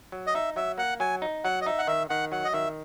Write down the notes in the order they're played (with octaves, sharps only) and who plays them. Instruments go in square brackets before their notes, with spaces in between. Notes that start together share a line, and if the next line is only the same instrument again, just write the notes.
[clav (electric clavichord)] F#3
[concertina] D#5
[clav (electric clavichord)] D#4 [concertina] E5
[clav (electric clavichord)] F#3 [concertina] E5
[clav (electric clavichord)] A#3 [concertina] F#5
[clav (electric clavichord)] F#3 [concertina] G#5
[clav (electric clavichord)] D#4
[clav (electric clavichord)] F#3 [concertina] F#5
[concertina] D#5
[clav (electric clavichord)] D#4 [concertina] E5
[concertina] F#5
[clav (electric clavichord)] D#3 [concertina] E5
[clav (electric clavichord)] D#3 [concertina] F#5
[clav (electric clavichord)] F#3 [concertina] F#5
[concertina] D#5
[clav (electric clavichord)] D#3 [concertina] E5